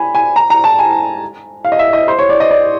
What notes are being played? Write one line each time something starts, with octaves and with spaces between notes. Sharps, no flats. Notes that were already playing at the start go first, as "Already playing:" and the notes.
Already playing: G#5 B5
G#5
A#5
A#5
A5
G#5
F5
D#5
E5
D#5
C5
C#5
D5
D#5
D5